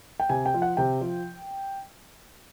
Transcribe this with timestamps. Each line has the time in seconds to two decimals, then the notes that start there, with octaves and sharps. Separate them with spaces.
0.20 G5
0.29 C3 G#5
0.46 G5
0.54 F3
0.62 F#5
0.77 C3 G5
1.01 F3